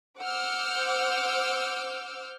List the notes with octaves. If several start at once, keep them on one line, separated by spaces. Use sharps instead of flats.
C5 F#5 D6 E6 F6 G6